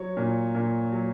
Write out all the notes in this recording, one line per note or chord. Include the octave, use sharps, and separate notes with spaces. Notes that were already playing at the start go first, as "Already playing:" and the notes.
Already playing: F#3 C#5
A#2
A#2
F#3